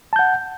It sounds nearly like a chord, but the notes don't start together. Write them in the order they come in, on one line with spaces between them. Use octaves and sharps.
A5 G6 F#5